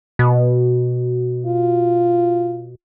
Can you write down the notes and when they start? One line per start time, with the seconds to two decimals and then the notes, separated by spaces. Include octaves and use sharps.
0.19 B2
1.46 F4